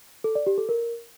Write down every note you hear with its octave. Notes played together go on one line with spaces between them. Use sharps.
A4
D5
G4
A4
A#4